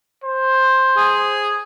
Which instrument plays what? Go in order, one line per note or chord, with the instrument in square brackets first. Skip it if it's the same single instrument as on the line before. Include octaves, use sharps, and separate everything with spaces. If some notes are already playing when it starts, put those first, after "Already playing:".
[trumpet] C5
[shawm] G#4